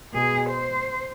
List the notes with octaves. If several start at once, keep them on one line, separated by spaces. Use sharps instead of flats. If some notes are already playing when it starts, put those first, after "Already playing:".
B2 G#4
C5